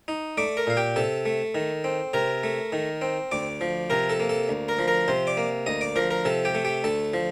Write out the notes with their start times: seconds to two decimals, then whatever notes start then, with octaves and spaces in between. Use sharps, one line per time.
0.08 D#4
0.38 A3 D5 D6
0.57 A#4 A#5
0.67 A#2 F5
0.77 G4 G5
0.96 C3 A4 A5
1.26 A3
1.55 D#3
1.84 C4
2.13 C3 A#4 A#5
2.43 A3
2.72 D#3
3.02 C4
3.32 D2 D5 D6
3.61 F3
3.90 C3 A#4 A#5
4.09 A4 A5
4.20 A#3
4.29 A4 A5
4.49 D2
4.68 A#4 A#5
4.79 F3
4.88 A#4 A#5
5.08 C3 C5 C6
5.27 D5 D6
5.37 A#3
5.66 D2 D#5 D#6
5.81 D5 D6
5.96 F3 A#4 A#5
6.11 A#4 A#5
6.25 C3 A4 A5
6.45 G4 G5
6.55 A3
6.65 G4 G5
6.84 D2 A4 A5
7.13 F3